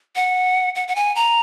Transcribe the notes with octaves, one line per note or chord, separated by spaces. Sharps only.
F#5
F#5
F#5
G#5
A#5